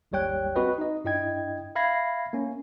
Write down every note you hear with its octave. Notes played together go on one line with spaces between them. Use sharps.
G#1 D#2 G3 C#5 G5 F#6
C4 F#4 B4 D#5
D#4 D#5
G2 D4 E4 D#5 G5 G#6
E5 F5 B5 G#6 A#6 C7
A#3 C#4